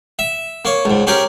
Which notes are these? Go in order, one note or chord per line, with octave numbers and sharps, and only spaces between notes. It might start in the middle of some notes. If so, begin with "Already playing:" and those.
E5
A#3 C#5
C#2 G#2
C#4 G4 G#4 A#4